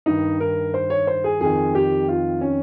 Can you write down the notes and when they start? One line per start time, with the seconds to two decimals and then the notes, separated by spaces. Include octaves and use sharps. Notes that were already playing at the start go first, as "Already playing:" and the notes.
0.06 G2 D#3 D#4
0.40 A#4
0.74 C5
0.90 C#5
1.07 C5
1.24 G#4
1.41 F2 D#3 G#4
1.75 G4
2.08 F4
2.41 C#4